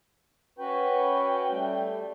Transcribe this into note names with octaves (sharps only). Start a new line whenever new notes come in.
C#4 F#4 B4 G5
G3 A3